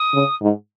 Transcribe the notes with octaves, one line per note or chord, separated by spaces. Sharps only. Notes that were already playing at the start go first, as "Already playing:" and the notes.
Already playing: D#6
C#3
G#2